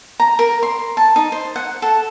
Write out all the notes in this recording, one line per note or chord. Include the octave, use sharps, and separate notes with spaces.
A#5
A#4
C6
A5
D#4
C5
F#5
A4